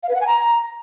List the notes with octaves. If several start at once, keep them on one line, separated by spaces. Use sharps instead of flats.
F5
B4
F#5
G#5
A#5